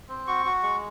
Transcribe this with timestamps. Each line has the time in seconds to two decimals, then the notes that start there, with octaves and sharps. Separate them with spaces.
0.09 C4
0.27 F#4 C#6
0.45 F#4
0.63 G#3 C#6